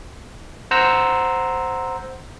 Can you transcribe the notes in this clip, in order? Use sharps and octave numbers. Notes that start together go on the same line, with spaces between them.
C5 F#5 A#5 E6